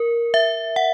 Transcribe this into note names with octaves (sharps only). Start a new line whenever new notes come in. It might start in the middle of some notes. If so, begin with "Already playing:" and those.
Already playing: A#4
E5
F#5